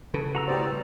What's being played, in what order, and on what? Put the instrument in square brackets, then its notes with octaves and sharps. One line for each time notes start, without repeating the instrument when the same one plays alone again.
[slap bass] C#3 [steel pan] A4 B4
[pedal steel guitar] F#4 A#5 E6
[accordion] A2 B3 D5 [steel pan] G4 C5
[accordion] B2 G3